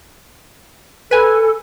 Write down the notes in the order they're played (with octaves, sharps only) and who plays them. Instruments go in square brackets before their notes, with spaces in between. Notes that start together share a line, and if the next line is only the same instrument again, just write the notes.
[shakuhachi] A4 [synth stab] B4 G#5